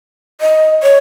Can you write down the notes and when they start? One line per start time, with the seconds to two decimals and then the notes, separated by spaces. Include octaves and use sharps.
0.41 D#5
0.83 C#5